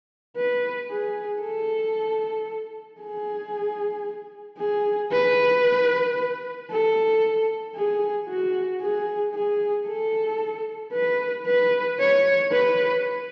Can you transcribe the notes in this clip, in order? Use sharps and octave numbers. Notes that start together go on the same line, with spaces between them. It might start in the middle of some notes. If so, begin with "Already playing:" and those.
B4
G#4
A4
G#4
G#4
B4
A4
G#4
F#4
G#4
G#4
A4
B4
B4
C#5
B4